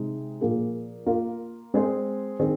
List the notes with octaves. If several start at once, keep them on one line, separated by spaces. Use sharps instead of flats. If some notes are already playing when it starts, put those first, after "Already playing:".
Already playing: C3 G#3 D#4
A#2 F3 A#3 G#4
A#3 F4 A#4
G#3 C4 G#4 C5
D#3 C4 G#4